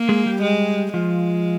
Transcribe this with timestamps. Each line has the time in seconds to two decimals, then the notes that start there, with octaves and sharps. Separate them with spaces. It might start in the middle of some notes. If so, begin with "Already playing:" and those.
Already playing: A#3
0.09 G#3 G#4
0.26 G3 G4
0.43 G#3
0.94 F3 G#3 F4